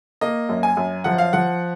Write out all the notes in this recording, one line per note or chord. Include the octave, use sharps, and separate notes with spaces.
A#3 D#5
F#2
G#5
F#2
F3 F#5
F5
F3 F#5